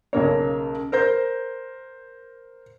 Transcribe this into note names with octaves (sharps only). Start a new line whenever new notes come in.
B1 C#3 A#3 C#5
A#4 C5 G6